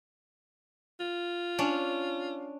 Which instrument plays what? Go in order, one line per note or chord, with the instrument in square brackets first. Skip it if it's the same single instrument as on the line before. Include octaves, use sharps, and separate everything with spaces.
[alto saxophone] F4
[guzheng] C#4 D4